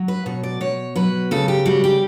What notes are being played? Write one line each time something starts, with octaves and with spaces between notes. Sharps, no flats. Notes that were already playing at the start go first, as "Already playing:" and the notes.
Already playing: F#3
B4
B2 C#5
D5
B2 C#5
F#3 B4
C#3 A4
G4
G3 F#4
G4